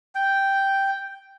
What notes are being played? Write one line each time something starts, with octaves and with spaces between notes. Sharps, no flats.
G5